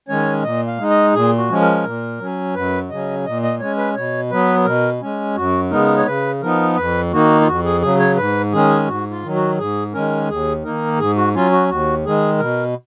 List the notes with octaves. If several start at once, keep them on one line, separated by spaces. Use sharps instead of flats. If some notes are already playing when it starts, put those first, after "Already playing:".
D#3 G#3 C#4 C#5
A#2 D#5
F5
G#3 D#4
D#5
A#2 G#4
F#4
F3 G#3 C#4
A#4
A#2
F#3 C#4
F#2 B4
C#3 F#3 C#4 D#5
A#2 D#5
D#5
G#3 C#4 C#5
B4
B2 C#5
F#3 B3 B4
B2 A#4
G#3 C#4
F#2 F#4
C#3 G#3 B3 D#4 A#4
C#5
C#3 B4
F3 B3 D#4 A#4
F2 B4
D#3 A#3 D#4 F#4
F4
F2 F#4
G#4
C#3 F#3 G#4
C#5
G#2 B4
D#3 G#3 C#4 G#4
G#2 F#4
F4
D#3 F#3
F#4
G#2 G#4
D#3 G#3 C#4 A#4
D#2 G#4
D#3 A#3 D#4 A#4
G#2 G#4
F#4
F#3 C#4 F4
F#4
D#2 F#4
D#3 G#3 G#4
B2 A#4